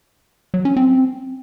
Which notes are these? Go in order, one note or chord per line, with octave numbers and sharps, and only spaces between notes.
F#3
C#4
C4